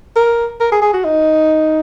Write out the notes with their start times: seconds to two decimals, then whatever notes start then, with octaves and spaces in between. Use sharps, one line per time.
0.16 A#4
0.61 A#4
0.72 G#4
0.82 G#4
0.93 F#4
1.04 D#4